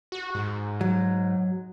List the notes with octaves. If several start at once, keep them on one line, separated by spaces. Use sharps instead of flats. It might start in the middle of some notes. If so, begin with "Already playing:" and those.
F#4
G#2
F#3